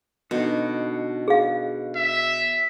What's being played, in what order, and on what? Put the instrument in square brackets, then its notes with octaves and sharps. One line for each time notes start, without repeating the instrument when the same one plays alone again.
[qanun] B2 [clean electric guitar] D3 D#4
[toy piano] G#4 F5
[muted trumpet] E5